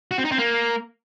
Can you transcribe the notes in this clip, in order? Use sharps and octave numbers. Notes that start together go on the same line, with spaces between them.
F#4
C4
D#4
C4
A#3